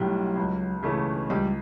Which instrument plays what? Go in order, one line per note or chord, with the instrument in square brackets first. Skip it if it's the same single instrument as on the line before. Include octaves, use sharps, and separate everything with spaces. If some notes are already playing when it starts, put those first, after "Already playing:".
Already playing: [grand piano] B1 A2 G3 [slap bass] F#3
[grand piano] C#2
C#3 E3 A3
[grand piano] C#2 [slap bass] G3